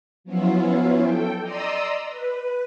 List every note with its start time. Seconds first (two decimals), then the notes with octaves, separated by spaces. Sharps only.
0.24 F3 F#3 B3 C#4 E4 F4
1.02 A4 G5
1.41 D5 D#5 A#5 C6 D#6 E6
2.07 B4